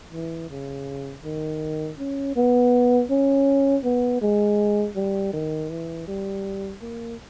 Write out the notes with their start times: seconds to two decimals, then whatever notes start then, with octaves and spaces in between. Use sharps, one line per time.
0.12 E3
0.50 C#3
1.24 D#3
1.99 C#4
2.36 B3
3.10 C#4
3.84 B3
4.22 G#3
4.96 G3
5.33 D#3
5.70 E3
6.07 G3
6.82 A#3